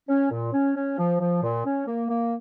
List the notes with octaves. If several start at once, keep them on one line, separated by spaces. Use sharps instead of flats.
C#4
A#2
C#4
C#4
F3
F3
A#2
C#4
A#3
A#3